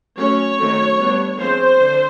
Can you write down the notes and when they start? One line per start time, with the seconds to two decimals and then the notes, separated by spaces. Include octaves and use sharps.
0.17 F#3 A3 C#4 C#5
0.59 D#3 F#3 A3 C4
0.99 G3 B3 D4
1.39 F3 G#3 C4 C5
1.79 D3